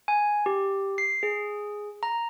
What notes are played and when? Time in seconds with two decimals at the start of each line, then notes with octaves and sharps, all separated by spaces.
0.08 G#5
0.46 G4
0.98 C7
1.23 G#4
2.03 A#5